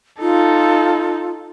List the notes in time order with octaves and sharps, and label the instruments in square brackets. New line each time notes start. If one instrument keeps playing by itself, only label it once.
[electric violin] D#4 A4 [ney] F4